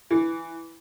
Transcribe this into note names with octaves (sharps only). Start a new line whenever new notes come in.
E3